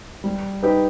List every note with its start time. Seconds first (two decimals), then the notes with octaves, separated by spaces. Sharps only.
0.24 G3
0.63 D#4 G4 B4